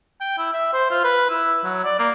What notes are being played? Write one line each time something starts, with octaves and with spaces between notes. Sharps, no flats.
G5
E4
E5
C5
F4
B4
E4
F#3
D5
A#3